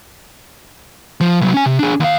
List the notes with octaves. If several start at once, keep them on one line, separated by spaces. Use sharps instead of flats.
F3
C2 F#3
C#4 G#5
C3
D4 G#4
D#2 F5